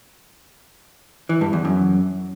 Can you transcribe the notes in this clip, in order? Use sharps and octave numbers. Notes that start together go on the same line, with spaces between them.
E3
G2
E2
F#2